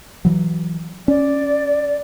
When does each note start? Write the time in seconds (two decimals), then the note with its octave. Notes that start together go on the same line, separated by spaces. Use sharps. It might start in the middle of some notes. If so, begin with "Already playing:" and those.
0.25 E3 F#3
1.08 C#4 D5